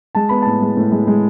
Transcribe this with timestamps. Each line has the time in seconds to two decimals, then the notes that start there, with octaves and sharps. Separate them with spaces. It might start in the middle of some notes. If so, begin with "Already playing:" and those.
0.15 G#3 A5
0.29 B3 B5
0.42 A2 A5
0.62 G#3
0.77 A2
0.92 G#3
1.07 G#3